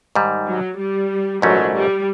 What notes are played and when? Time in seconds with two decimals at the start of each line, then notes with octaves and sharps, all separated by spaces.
0.15 G#2 D#3 G3
0.47 F#3
0.79 G3
1.42 A#1 G#2 E3 F#3 A3 C#4
1.75 G3